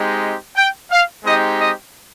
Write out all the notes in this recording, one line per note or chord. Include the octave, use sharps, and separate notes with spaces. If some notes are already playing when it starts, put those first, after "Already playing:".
Already playing: G#3 C4 D#4 G4
G5
F5
G#3 C4 D#4 G4 D#5
D#5